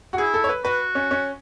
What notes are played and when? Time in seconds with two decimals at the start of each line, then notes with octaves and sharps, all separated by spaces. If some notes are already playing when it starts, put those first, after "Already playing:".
0.13 F#4
0.18 E4 G#4
0.34 A4
0.44 C#5
0.49 B4
0.64 F#4 B4
0.95 C#4
1.11 C#4